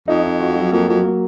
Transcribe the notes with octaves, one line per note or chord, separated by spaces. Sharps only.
F2 D#4
D#4
F#4
F#3
F2 A#3
F2 F#3
A#3